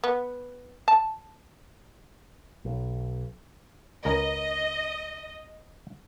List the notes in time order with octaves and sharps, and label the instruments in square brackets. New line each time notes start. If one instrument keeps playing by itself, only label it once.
[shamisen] B3
A5
[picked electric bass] B1
[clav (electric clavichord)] C#2 A#4 G#5 [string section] D#5